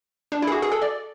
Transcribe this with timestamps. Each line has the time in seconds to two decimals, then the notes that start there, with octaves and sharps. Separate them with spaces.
0.32 D4
0.42 E4
0.47 G#4
0.52 F#4
0.62 G#4
0.72 A4
0.82 D5